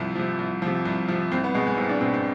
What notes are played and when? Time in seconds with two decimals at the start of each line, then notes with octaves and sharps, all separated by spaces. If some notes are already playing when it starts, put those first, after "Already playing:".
Already playing: C2 C3 F3
0.15 C3 F3
0.39 C2
0.62 C3 F3
0.85 C2
1.09 C3 F3
1.32 C2 C4
1.44 B3
1.54 B2 G#3
1.67 G#3
1.78 C2 C4
1.89 D4
2.01 B2 C4
2.14 C4